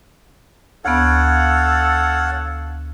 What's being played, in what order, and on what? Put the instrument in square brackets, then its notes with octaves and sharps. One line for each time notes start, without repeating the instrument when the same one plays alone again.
[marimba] D2 B3 [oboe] A4 [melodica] C#5 F5 F#5